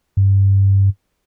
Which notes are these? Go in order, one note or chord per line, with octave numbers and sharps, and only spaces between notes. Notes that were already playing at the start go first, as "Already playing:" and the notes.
G2